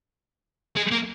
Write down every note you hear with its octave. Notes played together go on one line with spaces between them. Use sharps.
G#3
A#3